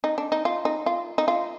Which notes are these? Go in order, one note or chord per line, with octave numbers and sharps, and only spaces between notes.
D#4
D4
D#4
F4
D#4
F4
D#4
F4